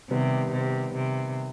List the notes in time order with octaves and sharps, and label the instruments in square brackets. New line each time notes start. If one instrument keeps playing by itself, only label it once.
[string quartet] C3 [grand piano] D#3 G3 B3
[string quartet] C3
C3